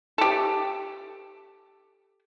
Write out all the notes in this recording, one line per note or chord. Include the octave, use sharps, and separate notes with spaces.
G4 A4